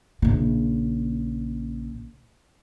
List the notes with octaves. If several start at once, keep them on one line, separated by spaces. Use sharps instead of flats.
A#1 C#3